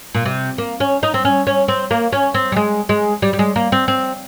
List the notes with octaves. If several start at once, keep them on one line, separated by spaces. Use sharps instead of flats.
A#2
C3
A#3
C#4
D#4
C4
C#4
C#4
C4
A#3
C#4
C4
G3
G#3
G#3
G3
G3
G#3
A#3
C4
C4